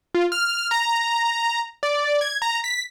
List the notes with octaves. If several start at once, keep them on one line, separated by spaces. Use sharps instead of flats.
F4
F6
A#5
D5
G#6
A#5
B6